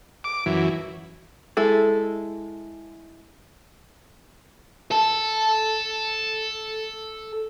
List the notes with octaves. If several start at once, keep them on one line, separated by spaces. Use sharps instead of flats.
D6
F#2 E3
G#3 E4 A4
A4 A5